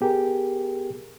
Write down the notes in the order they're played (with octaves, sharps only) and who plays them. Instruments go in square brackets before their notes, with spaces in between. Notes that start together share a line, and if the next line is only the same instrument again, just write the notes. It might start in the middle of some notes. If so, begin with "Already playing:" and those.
[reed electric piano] B3 G4 G#4 A#4